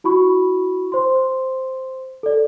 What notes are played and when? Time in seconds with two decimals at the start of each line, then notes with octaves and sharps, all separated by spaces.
0.04 E4 F#4 B5 C#6
0.92 C5 C6
2.23 A4 D5